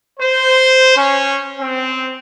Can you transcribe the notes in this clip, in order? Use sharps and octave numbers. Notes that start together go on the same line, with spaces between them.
C5
C#4
C4